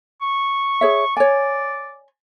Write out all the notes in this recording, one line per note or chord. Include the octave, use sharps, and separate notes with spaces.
C#6
G#4 C#5 E5
C#5 D5 G#5